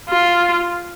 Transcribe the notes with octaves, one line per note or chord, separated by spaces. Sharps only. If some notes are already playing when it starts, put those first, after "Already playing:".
F4